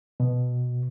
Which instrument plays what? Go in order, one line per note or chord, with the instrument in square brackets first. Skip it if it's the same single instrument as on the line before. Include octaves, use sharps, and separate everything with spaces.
[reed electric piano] B2